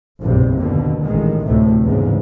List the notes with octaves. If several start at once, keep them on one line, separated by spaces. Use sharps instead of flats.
F#1 B1 G2 C3
D#2 B2 D3
A1 D#3 G#3
D2 A2 C3 A3
E2 G#2 C#3